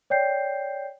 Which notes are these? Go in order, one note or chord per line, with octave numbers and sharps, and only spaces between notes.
C#5 D5 G5 G6 C7